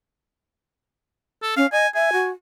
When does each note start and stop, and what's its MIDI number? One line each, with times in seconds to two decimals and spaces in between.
1.42 1.55 69
1.57 1.66 61
1.57 1.66 77
1.72 1.87 75
1.72 1.88 80
1.95 2.10 76
1.95 2.28 80
2.13 2.30 66